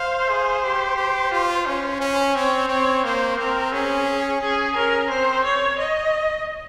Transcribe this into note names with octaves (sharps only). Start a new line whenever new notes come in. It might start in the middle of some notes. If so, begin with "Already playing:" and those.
Already playing: C5 F5
G#4
G4
G4
F4
C#4
C#4
C4 C#5
C4 C#5
A#3 C5
C4 A#4
C#4 G#4
C#4 G#4
C#4 A#4
C4 C5
C#5
D#5